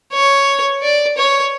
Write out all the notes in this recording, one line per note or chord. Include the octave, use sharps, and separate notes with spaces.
C#5
D5
C#5